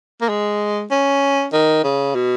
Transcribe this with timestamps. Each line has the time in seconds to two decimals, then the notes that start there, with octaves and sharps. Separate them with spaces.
0.21 A#3
0.29 G#3
0.91 C#4
1.53 D#3
1.84 C#3
2.15 B2